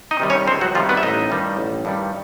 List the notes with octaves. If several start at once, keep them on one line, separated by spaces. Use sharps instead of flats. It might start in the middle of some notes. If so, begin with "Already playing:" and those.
D#4 D#5
C3 D#3 G3
C#4 C#5
C#2 C4 C5
F#3 F#4
C3 D#3 F3 G3 F4
B3 B4
E5
A1 D#4 D#5
G2 D#3 G3
A1
G2 D#3 G3